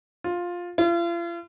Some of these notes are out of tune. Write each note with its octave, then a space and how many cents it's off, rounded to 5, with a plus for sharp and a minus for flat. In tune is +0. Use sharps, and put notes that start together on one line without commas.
F4 +10
F4 -40